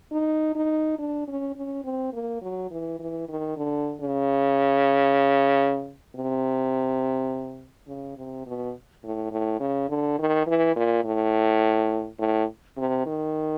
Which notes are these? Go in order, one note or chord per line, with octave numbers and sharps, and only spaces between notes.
D#4
D#4
D4
C#4
C#4
C4
A#3
F#3
E3
E3
D#3
D3
C#3
C3
C#3
C3
B2
A2
A2
C#3
D3
D#3
E3
A#2
A2
A2
C3
D#3